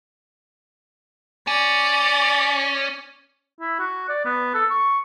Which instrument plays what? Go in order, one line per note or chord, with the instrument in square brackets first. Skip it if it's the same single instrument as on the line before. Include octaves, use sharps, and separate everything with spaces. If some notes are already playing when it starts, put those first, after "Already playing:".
[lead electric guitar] C#4 [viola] D5
[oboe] E4
F#4
D5
B3
A4
C#6